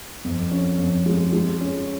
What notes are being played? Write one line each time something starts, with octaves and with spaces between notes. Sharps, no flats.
F2
C#4
F2
G#3
G#3
C#4